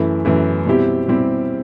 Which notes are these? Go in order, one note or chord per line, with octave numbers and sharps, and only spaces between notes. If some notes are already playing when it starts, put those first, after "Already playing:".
Already playing: F#2 E3 A3 E4
F#2 E3 A3 E4
B2 G3 C4 E4 G4
B2 G3 C4 E4 G4